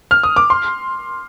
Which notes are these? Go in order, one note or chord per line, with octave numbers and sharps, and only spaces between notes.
F6
D#6
D6
C6